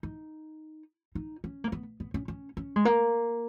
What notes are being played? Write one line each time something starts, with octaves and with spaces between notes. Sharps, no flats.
D#4
D#4
C#4
A#3
B3
B3
C#4
C#4
C#4
G#3
A#3